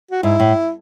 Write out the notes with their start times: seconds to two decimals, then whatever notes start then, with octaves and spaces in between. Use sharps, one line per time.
0.11 F#4
0.23 G#2 E4
0.40 A2